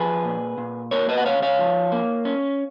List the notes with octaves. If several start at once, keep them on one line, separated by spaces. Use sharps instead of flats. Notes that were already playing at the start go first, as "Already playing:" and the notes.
Already playing: F3 G#4 B4
A#2
A#2
A#3 A#4 C#5
B4 D#5
F#5
C#2 C#5 F5
C#5 F5
F3
A#3
C#4